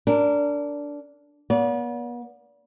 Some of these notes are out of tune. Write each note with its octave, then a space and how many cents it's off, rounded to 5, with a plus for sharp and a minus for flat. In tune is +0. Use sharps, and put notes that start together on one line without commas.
D4 -15 A#4 -20
B3 -40 D5 -40